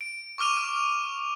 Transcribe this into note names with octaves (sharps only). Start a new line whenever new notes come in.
D7
C#6 D6 F6 D#7 F7
F6